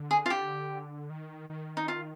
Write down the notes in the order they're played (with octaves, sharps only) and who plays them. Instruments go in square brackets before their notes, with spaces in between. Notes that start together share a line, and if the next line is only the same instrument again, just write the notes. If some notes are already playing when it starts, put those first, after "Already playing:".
Already playing: [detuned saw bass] D3
[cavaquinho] G#4
F4
G4
[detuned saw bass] D#3
D#3
[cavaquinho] D#4
F4